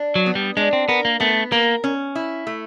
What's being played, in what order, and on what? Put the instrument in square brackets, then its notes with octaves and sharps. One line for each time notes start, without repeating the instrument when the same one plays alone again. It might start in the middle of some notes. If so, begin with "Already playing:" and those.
Already playing: [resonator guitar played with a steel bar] D4
[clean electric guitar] F#3
[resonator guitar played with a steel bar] B3
[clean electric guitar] G3
[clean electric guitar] G#3 [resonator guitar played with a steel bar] D4
[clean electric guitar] C4
[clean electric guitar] B3 [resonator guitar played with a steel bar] A#4
[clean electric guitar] A#3
[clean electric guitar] A3 [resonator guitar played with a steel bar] B3
[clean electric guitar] A#3 [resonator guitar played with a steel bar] A#4
[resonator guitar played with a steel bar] C#4
E4
A3